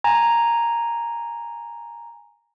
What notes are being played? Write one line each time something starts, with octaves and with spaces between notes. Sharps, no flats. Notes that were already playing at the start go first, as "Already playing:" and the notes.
G#5 A#5